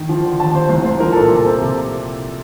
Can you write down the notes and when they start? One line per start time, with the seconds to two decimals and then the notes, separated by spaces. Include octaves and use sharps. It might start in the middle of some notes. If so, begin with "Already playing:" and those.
Already playing: D#3
0.09 F3
0.25 D3
0.40 D#2 A5
0.54 C4 C5
0.69 C2 C5
0.85 C2 C5
1.00 F3 A#4
1.12 A#2 A4
1.30 C3
1.36 A4
1.45 C4
1.61 C3